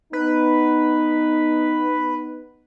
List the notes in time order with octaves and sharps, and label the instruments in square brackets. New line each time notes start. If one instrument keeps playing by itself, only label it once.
[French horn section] B3 D#4 [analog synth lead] B4